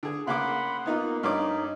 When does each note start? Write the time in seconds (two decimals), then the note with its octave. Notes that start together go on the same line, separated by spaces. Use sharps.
0.03 D3 G#4
0.27 C#3 A#3 F#5 B5 C6 D6
0.86 A#3 B3 D#4 F4
1.23 G2 C#4 D#4 D6